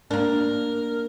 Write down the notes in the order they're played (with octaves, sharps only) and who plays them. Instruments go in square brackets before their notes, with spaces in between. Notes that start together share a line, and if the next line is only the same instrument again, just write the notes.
[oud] A#3 D4 [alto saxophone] A#4